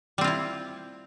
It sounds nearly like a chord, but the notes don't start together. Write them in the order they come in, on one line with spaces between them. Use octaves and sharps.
G3 C4 F4 E4